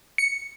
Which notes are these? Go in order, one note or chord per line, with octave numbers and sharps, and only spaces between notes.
C#7